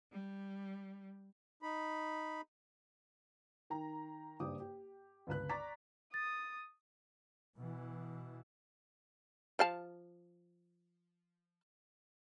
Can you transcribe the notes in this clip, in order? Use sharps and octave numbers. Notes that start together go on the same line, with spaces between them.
G3
D#4 B5
D#3 G5 A#5
F#1 G2 G4 D5 D6 D#6
G4
G1 C#2 B4 F#6
D5 A#5 C#6 D6 A6 B6
D#6 A6
B2 E3
F3 F5 A5